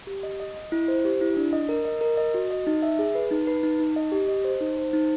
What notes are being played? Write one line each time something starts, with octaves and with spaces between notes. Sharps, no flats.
G4
D#5
D#5
D#5
E4
C5
G4
E4
D4
D#5
A#4
D#5
A#4
D#5
F#4
D#5
D#4
E5
G#4
B4
D#4
B4
D#4
D#4
D#5
G4
D#5
C5
D#4
C5
D#4